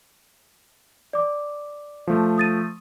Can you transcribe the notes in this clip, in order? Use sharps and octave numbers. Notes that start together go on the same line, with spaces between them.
D5 D6
F3 A3
D#6 A6 D#7